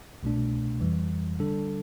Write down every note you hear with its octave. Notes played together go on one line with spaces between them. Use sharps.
C2 B2 A3 D4
F2 E3 G3
D3 G3 D4 A4